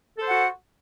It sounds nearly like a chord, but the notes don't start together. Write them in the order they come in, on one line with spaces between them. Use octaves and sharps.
A4 C5 F#5 F#4